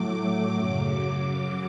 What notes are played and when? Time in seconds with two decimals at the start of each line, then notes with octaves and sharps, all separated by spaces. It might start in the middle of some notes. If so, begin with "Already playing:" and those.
Already playing: A2 F#3 A3 D6
0.56 F#2 C#3 F#3